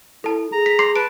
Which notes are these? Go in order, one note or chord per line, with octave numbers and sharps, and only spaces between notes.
E4 A4 A5
G#4 A#5
B6
C6 D6 C7
B4 A5 D7